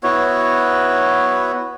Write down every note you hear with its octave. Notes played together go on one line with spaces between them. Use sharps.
B3 E4 F#4 C#5